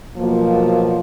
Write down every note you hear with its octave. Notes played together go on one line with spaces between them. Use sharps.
B2 F3 F#3 A#3